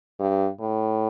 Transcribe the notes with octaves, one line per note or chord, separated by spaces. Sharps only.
G2
A2